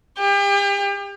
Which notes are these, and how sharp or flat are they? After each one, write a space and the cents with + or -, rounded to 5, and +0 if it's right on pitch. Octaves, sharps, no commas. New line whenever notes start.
G4 +40